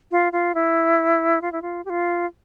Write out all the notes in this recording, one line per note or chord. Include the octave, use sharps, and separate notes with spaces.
F4
F4
E4
F4
E4
F4
G4
F4